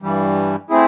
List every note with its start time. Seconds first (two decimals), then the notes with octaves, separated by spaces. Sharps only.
0.02 G2 E3 G3
0.70 A3 C4 E4 G#4